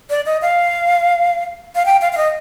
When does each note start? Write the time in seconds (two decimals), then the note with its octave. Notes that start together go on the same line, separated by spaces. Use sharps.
0.10 D5
0.26 D#5
0.42 F5
1.75 F5
1.86 G5
2.01 F5
2.13 F5
2.17 D#5